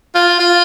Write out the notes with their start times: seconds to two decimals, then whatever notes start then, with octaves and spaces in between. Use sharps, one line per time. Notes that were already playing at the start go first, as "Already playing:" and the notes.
0.15 F4
0.39 F4